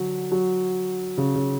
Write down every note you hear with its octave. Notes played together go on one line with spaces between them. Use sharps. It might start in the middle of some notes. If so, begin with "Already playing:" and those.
Already playing: D3 F#3
F#3
C#3
C#3